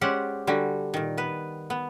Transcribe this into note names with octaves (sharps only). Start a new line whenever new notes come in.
G#3 C#4 G4 C5 D5 F#5
D3 G3 F#4 G#5
A#2 D#3
B3 B4
B3